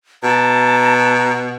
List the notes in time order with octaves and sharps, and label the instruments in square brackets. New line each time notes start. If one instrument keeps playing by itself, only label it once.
[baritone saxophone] B2 [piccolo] A5 [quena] A#5